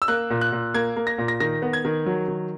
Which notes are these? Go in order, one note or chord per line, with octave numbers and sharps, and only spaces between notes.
E6
A#3 F#6
A#2
F#6
A#2
A#3 G#6
A#3
A#6
A#2
A#6
D#3 A#6
B3
G#6
D#3
F#3
D#3